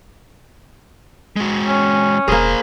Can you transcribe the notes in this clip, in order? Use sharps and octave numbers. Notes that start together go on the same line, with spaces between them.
G#3 F#4
C#4
E1 A#3 G#4 A#4 C5